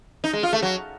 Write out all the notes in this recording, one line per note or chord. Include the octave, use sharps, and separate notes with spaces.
D#4
G#3
F4
A3
F#3